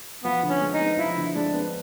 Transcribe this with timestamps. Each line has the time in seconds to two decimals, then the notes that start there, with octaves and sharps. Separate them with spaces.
0.24 F3 B3
0.43 D3
0.49 C#4
0.61 G#3
0.73 D#4
0.80 B3
0.97 F3 E4
1.17 D3
1.35 G#3 D4
1.54 B3